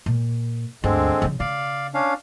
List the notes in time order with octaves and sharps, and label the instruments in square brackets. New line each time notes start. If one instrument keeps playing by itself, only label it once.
[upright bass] A#2
[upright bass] D2 G2 [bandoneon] D3 G#3 C4
[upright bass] C#3 F3
[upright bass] C#3 [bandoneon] D5 F5
[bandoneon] C#4 D4 F5